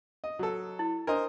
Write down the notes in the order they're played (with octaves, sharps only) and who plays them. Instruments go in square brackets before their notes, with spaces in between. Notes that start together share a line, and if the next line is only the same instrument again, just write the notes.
[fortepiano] D#5
F#3 A4
[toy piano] E4
[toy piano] D4 [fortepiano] A#4 C5 D#5